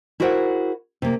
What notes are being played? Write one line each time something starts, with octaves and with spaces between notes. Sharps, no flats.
E4 F#4 G#4 A#4 C5 F#5
C3 A#3